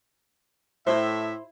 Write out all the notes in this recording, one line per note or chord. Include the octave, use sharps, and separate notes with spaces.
A2 E4 C5 E5